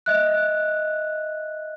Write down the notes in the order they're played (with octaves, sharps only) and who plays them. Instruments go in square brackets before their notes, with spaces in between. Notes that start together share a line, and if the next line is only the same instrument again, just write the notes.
[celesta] D#5 E5 F#6